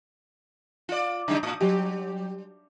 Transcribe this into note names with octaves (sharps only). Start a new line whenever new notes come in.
F4 D5
C#3 G3 D#4
A2 D#6
F#3 G3 G4